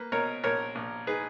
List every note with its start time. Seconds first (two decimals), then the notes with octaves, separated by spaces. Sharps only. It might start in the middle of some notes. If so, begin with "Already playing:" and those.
Already playing: A#3 B4
0.12 B2 A#4 C#5
0.44 A#1 A#4 C#5
0.75 A#1
1.07 D#4 G#4 B4